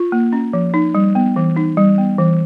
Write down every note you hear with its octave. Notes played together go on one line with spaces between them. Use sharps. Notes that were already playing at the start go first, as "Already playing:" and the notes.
Already playing: F4
A#3
C#4
F3
D#4
G3
B3
E3
D#4
G3
B3
E3